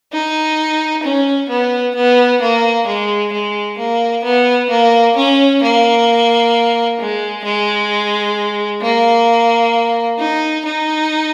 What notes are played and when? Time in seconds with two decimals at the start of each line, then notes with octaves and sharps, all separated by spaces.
0.13 D#4
1.03 C#4
1.49 B3
1.95 B3
2.41 A#3
2.87 G#3
3.32 G#3
3.78 A#3
4.24 B3
4.69 A#3
5.16 C#4
5.62 A#3
6.99 G#3
7.44 G#3
8.81 A#3
10.19 D#4
10.65 D#4